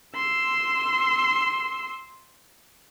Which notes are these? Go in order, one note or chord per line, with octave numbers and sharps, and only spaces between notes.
C6 E6